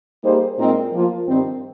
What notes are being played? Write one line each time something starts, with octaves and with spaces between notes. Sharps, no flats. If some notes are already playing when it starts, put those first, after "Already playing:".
G3 A#3 D#4 G#4 C5
A#2 G#3 C4 D#4 A#4
F3 A#3 F4
G2 D#3 G3 C4